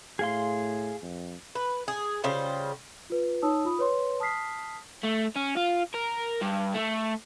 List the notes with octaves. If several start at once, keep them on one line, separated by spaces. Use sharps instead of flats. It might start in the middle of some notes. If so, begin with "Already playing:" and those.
A2 G#4 F5 C6
F2
B4
G#4
C#3 G3 F4 C5
F4 B4
D#4 C#5 A5 D#6 E6
F4 B5 D#6
B4 C#5 C6
A5 D#6 F6 B6 C7
A3
C#4
F4
A#4
G2
A3